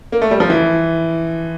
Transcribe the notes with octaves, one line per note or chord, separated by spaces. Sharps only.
A#3
A3
G3
F3
E3